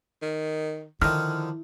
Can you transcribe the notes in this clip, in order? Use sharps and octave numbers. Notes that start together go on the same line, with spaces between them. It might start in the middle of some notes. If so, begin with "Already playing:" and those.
D#3
D3 D#3 F3 E4 F6